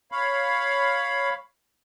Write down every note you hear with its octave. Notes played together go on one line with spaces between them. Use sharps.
C#5 F5 B5